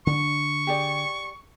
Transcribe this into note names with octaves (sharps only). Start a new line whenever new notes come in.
D3 D4 C#6
G4 G#4 D5